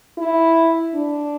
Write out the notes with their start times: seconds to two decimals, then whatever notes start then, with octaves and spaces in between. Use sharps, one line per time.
0.18 E4
0.94 D4